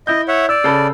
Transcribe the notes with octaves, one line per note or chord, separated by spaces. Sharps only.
E4 D#5 G6
C#5 E5 F#5
D5 E6
C#3 A4 B5